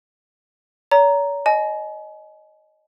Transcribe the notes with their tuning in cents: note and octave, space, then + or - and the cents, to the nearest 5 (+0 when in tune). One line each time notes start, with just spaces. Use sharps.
C#5 +45 A#5 +0
D#5 -5 G#5 +35